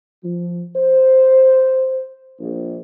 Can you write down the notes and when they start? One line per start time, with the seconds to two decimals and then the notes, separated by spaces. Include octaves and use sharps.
0.24 F3
0.75 C5
2.39 A#1